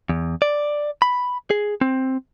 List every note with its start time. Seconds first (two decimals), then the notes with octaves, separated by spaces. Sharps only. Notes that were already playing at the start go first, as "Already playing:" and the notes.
0.09 E2
0.42 D5
1.02 B5
1.51 G#4
1.81 C4